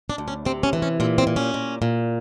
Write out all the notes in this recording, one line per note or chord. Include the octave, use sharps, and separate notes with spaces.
D4
D2
C#4
C3 C4
C#4
E3
C#4
A#2 C4
C4
A#2
C#4
A#2
A#2